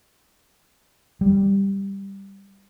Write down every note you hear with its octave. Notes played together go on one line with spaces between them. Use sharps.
G3